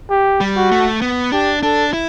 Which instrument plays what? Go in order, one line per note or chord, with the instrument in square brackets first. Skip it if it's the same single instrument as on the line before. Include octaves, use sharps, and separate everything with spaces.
[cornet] G4
[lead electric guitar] G3
[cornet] F#4
[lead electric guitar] A3
B3
[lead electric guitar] D4 [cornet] G4
[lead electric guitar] D4 [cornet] A4
[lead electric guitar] E4